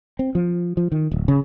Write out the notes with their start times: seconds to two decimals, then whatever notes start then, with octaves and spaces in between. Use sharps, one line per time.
0.19 C4
0.35 F3
0.77 F3
0.92 D#3
1.12 D1
1.28 C#3